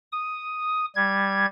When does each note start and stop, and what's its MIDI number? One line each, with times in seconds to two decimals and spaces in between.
0.12 0.86 87
0.95 1.46 55
0.95 1.46 92